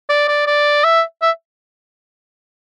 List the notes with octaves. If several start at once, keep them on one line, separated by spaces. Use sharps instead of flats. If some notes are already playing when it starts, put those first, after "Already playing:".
D5
D5
D5
E5
E5